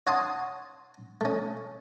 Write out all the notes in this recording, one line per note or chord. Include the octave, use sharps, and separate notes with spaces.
C#5 F#5 G#5 A5 C6 D#6
A3 C#4